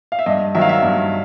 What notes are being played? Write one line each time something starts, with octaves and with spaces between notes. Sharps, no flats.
F5
E5
G2 D#5
D#3 F#3 E5
F5
E5
G2